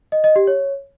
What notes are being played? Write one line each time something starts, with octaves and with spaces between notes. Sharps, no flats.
D#5
D#5
G4
C#5